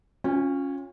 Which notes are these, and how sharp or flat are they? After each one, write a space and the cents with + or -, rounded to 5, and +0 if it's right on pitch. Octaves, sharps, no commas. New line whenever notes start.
C#4 +0 F4 +25 G#5 -45